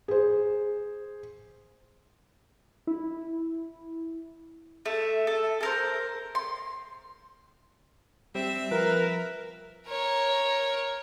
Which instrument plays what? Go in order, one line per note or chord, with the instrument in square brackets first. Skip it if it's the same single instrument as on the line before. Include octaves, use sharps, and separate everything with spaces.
[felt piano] G#4 C5
[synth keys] E4
[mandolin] A3 E5
A4
A4 A#4 C5
C6
[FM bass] G3 [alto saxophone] C4 [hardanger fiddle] E5
[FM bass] F3 [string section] A#4 [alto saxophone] B4
[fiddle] A#4 C#5